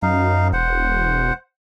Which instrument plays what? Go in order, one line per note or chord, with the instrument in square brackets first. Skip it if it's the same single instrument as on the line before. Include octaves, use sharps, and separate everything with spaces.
[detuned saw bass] F#2 [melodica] D#4 F5
[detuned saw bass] E1 [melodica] C5 F#5